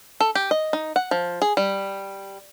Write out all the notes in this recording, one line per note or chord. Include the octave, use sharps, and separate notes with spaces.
A4
G4
D#5
D#4
F#5
F3
G#4
G3